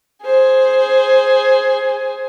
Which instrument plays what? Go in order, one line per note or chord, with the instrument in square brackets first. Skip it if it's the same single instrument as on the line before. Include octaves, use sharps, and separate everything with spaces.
[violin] G#4 C5